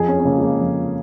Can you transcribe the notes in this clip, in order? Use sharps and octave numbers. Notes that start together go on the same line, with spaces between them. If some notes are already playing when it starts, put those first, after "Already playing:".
Already playing: F2 G#4
C#4
C#4
C#3 A#3
G#3
A#3
F2